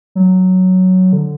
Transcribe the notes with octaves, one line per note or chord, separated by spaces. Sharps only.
F#3
D3